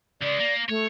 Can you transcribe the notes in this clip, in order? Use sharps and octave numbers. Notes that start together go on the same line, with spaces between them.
C#2 G#3 D5
A#3
A3 C#5